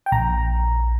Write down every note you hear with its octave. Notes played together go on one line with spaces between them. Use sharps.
G5
A#1 A#5